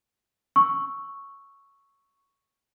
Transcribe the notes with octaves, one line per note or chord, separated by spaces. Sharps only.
C#6 E6